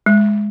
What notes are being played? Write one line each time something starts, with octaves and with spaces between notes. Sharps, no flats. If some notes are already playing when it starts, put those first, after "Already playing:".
G#3